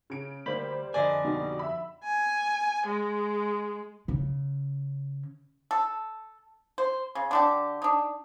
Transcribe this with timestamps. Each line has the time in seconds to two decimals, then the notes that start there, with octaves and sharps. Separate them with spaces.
0.10 C#3 D7
0.46 D2 G3 A#3 G4 C5 B5
0.94 F2 D3 D5 D#5 G#5
1.24 B2 G3 D#4
1.59 E5 B5
2.04 G#5
2.87 G#3
4.08 C#3
5.71 A4
6.78 C5
7.15 C#3
7.31 D3 D4 G4
7.82 D4 D#4